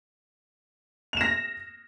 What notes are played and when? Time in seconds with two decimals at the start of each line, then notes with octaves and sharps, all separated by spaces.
1.13 F7
1.17 E7
1.21 A#6